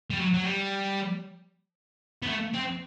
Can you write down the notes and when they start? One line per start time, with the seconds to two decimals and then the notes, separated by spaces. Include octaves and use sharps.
0.10 G3
0.19 F#3
0.34 F#3
0.44 G3
2.23 B3
2.27 A3
2.54 C4